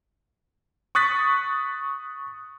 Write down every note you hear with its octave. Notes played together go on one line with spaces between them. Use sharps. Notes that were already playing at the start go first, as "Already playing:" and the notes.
C#6 D#6 F#6 A6 B6